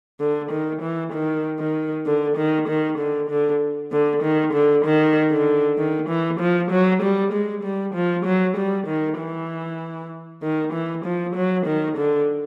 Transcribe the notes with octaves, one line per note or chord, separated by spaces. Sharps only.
D3
D#3
E3
D#3
D#3
D3
D#3
D#3
D3
D3
D3
D#3
D3
D#3
D3
D#3
E3
F3
F#3
G3
G#3
G3
F3
F#3
G3
D#3
E3
D#3
E3
F3
F#3
D#3
D3